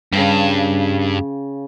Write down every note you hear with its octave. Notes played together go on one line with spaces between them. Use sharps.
G2 C#3 F5 G5